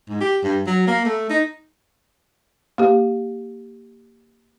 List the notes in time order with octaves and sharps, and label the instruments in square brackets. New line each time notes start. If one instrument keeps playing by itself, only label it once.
[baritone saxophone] G#2
G4
G2
F#3
A#3
A3
D#4
[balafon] A#3 G4